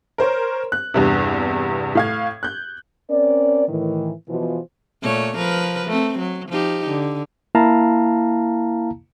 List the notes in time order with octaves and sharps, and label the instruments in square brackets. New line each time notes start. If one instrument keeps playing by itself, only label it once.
[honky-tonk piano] A#4 C5 C#5
F#6
E2 G2 C3
A2 F5 G#6
F#6 G6
[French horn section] C4 C#4 A#4 D5
A2 D#3 E3
B2 E3 F3
[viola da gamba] A#2 A3 C#5
F3 A#4 B4
A3 C4
F#3
F3 D#4 G4
D3
[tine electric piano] A#3 E4 F5 A5 A#5